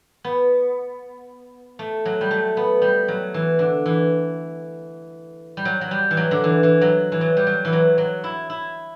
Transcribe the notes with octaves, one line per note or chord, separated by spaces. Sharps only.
B3
A3
F#3
G3
A3
B3
G3
F#3
E3
D3
E3
G3
F#3
F#3
G3
E3
F#3
D3
E3
E3
F#3
E3
F#3
G3
F#3
E3
F#3
F#3
E4
E4